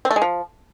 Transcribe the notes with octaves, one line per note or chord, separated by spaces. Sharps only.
C4
A3
G#3
F3